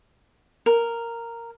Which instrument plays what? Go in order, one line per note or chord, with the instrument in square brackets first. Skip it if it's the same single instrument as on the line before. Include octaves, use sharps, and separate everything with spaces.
[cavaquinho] A#4